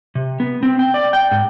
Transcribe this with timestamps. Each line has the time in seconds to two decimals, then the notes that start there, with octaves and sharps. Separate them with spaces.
0.15 C3
0.40 B3
0.63 C4
0.79 G5
0.94 D5
1.13 G5
1.31 G#2